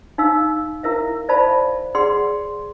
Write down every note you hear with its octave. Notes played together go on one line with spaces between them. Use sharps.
D#4 F5 E6
E4 A#4 E5 F5
C5 D5 E5 F5 A5 B5
G#4 D5 F#5 C6